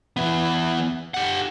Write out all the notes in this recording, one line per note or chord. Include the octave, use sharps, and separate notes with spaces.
E3 B3
G4 F#5